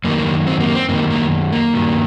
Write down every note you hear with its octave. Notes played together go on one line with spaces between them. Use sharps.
F#2 D#3 A#3
C4
A#3
C4
F#2 D#3 A#3
A#3
A#3
G2 D#3